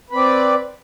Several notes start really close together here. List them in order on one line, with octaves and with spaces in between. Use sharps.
B4 C4 D5